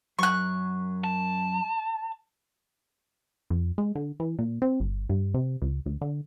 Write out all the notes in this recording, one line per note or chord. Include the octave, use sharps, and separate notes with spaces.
F#2 F#3 C#6 F#6
A5
F2
G#3
D3
E3
A#2
C4
G1
G2
C3
C#2
D2
D3